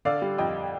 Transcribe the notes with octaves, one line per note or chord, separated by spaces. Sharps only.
D3 D5 F5
G3
F2 D#5 G5